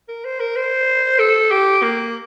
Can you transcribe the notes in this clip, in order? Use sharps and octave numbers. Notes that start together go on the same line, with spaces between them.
A#4
C5
A#4
C5
A4
G4
A#3